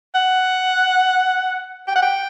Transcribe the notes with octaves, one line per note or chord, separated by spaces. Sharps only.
F#5
G5
F#5
G5